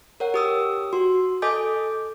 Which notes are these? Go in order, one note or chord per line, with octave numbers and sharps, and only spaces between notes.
A#4 C#5 F#5
G4 D#6 E6
F#4 C6
A4 D#5 G#5 D6 G6